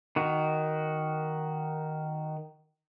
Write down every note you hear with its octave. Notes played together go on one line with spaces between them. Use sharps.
D#3 F#4